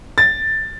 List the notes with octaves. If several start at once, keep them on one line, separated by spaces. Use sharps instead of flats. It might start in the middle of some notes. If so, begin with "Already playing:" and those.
A6